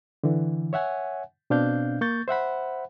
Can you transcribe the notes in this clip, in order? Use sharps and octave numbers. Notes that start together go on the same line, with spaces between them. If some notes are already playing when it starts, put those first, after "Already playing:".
D3 E3
C#5 E5 F#5 G#5
B2 C4 D4 F5 G6
A#3 C#6 G6 A6
C5 E5 F#5 B5